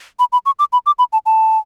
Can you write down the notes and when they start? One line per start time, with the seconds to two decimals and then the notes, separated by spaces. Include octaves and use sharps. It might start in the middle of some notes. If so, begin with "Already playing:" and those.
0.19 B5
0.32 B5
0.46 C#6
0.59 D6
0.73 B5
0.86 D6
0.99 B5
1.13 A5
1.26 A5